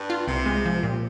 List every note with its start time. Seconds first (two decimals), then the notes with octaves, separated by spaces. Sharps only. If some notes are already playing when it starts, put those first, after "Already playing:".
Already playing: G2
0.10 F4
0.28 C2 C3
0.46 G#3
0.65 F3
0.83 A#2